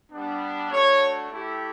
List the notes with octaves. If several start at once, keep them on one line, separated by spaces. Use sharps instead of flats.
G3 B3 D4
A3 D4 F#4 C#5
A3 E4 G4